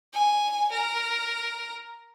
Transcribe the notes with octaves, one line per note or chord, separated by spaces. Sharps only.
G#5
A#4